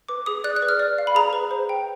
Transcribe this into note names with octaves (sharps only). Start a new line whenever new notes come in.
B4 D6
G#4 D#6
D5 F#6
F#6
B4
F6
D5
F5
B5
G#4 A#5
B4
C5
G5